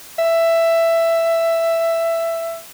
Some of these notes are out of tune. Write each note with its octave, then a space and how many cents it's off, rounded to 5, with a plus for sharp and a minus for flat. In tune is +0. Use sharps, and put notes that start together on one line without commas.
E5 +10